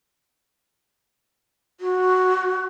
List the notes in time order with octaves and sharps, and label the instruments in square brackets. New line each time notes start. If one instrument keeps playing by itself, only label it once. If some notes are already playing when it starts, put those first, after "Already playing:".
[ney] F#4